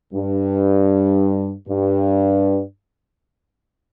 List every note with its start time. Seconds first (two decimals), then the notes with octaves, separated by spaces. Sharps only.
0.13 G2
1.68 G2